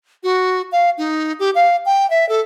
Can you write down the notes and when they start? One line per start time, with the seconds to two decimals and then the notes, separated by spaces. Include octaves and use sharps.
0.23 F#4
0.72 F5
0.98 D#4
1.39 G4
1.55 F5
1.86 G5
2.10 E5
2.29 A4